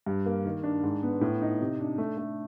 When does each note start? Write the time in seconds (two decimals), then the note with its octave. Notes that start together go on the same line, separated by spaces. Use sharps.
0.06 G2
0.26 A#3
0.45 D#3
0.64 D4
0.83 G#2
1.03 B3
1.21 A2
1.42 D#4
1.61 C3
1.80 D4
1.98 A3
2.17 A3